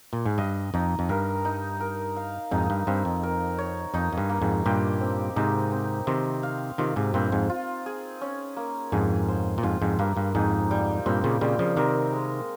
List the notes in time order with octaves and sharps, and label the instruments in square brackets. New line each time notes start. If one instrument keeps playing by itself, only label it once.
[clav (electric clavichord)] A#2
G#2
[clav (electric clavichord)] G2 [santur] D#5
[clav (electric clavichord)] F2 [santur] D#4
[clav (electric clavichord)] F2
[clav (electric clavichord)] G2 [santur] A#4
[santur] D#4
A#4
F5
[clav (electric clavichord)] F2 G#2 [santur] D#4
[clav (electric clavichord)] G2
[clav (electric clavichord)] G2 [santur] C4
[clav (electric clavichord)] F2
[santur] A#4
C#5
[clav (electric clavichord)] F2 [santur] D#4
[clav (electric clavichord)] F2
G2
[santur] A#3
[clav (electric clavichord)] F2 G#2
[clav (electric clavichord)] G2 A#2 [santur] G4
[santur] C4
[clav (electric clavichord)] G#2 C3 [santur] D#4
[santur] C4
[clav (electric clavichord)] C3 D#3 [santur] C5
[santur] F5
[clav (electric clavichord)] C3 D#3 [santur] F4
[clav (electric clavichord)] G#2 C3
[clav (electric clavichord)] G2 A#2 [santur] C4
[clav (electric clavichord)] F2 G#2
[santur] F4
G#4
C#4
A#3
[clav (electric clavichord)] F2 G#2 [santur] G#4
[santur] C5
[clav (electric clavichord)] A#2
[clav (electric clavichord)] F2 G#2 [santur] F4
[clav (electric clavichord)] F2 G#2
[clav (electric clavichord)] G2 [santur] A#3
[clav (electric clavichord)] G2
[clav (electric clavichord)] F2 G#2 [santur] D#4
[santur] G3
[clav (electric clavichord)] G2 A#2 [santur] C4
[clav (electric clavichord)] A#2 C#3
[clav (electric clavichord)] A#2 C#3 [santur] G3
[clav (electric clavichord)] C#3 F3
[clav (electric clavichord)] C3 D#3 [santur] A#4
[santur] G#3